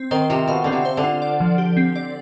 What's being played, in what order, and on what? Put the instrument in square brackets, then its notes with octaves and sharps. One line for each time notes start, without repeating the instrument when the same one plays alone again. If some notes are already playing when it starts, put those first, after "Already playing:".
Already playing: [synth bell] C4
[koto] D#3 [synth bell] C5
[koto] C3 [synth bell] F4
[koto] B2 [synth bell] F5
[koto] D3 [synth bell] C4
[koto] C3
[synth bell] C5
[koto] D3
[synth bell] F4
D5
F3
G4
C4
D5